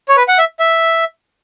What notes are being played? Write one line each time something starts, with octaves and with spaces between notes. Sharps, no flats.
C#5
B4
F#5
E5
E5